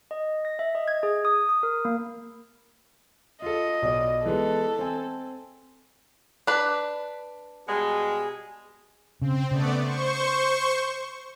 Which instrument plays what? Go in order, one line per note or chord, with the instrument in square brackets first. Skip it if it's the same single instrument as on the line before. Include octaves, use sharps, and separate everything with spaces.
[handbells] D#5
A#6
E5
D#5
G#6
G#4
D#6
D#6
A#4
A#3
[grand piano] F4 A4 [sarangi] D#5
[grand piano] B1 D5
[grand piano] E3 G#3 B3 [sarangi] A4
[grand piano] C4 G#5
[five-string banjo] D4 B4
[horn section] B2 G3 G#3 [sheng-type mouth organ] G#4
[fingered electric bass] C#3 [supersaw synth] C4
[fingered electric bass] C#3 [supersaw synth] A3 B3 D5
[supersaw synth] C5 C#6